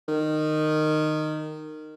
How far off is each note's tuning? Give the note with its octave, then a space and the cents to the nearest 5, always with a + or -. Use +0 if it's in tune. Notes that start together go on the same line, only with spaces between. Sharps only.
D#3 -15